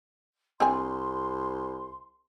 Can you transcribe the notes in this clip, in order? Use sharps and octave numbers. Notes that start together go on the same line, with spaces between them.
C2 C4 D4 G#5 C6